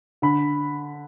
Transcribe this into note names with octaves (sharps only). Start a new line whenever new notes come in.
D3 B5